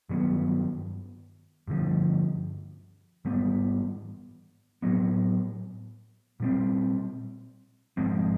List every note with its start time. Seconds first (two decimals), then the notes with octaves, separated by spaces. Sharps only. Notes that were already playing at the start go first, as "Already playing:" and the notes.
0.09 G2 D#3 F#3 B3
1.68 G2 D3 F3
3.25 G#2 E3 G3 B3
4.82 A2 F#3 B3
6.40 A#2 G3 C4
7.97 G#2 F3 G#3 C4